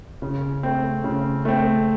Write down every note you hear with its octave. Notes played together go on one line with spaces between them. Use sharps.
C#3
A3 C4
C#3
A3 C4